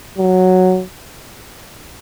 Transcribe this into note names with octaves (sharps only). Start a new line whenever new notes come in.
F#3